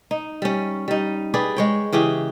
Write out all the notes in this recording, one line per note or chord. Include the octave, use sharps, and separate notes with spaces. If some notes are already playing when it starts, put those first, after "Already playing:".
D#4
G3 C#4
G3 D#4
G4 G#4 B4 D5
G#3 C#5 G5
C#3 E3 G4 G#4